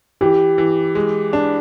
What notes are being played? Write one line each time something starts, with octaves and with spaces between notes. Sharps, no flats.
E3 G4
E3
G#3
D4